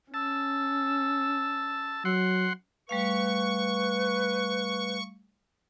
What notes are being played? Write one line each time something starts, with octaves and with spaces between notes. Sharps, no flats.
C#4 A5 E6
F#3 F#5 C6
G3 A3 B4 F5 C#6